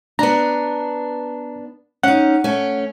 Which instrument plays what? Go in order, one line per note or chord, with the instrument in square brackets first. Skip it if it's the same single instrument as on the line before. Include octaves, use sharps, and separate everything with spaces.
[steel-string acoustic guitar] B3 D4 [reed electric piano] A#5
[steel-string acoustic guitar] C#4 D#4 [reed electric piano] F#5
[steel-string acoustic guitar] A3 C#4